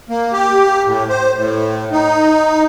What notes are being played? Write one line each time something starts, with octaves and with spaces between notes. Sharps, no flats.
A#3
G4
A2
C5
A2
D#4